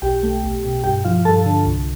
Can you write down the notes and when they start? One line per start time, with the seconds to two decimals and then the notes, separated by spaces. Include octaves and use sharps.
0.02 B1 G4 G5
0.23 A3
0.44 B1
0.64 B2
0.84 G2 G4 G5
1.05 F3 F4 F5
1.25 G2 A4 A5
1.46 D3
1.66 C2